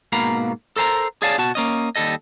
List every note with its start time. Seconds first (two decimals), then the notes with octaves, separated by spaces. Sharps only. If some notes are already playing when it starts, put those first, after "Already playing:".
0.12 G#2 B2 A#3 F5 A#5 B5
0.76 A4 A#4 C5 A5 A#5
1.22 G#4 C#5 D5 F5 G#5 A5
1.38 B2 F#4 A5
1.55 A#3 C#4 D#5
1.96 D#2 G3 A4 D#5